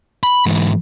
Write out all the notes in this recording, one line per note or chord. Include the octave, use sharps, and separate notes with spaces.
B5
G#2 E3